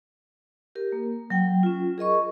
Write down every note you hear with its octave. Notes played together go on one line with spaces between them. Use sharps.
G4 A#4
A#3
F#3 G5
C#4 F4
G#4 A#4 D#5 C#6